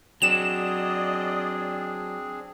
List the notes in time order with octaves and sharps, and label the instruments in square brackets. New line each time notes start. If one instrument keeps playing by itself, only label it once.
[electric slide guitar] F#3 [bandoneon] C4 D4 G#4 [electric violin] D5 D#5 [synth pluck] E7